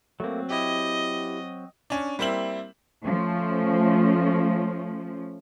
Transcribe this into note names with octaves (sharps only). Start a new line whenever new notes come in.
F#3 A3 A#3 C4
E4 G4 D#5
C#4 D4
G3 A#3 C4 E4 F#7
F3 A3 C#4